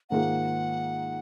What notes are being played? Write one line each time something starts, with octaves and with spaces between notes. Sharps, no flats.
G#2 D#3 A#3 F4 G#4 F#5